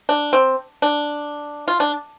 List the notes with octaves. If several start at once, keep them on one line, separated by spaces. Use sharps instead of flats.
D4
C4
D4
F4
D4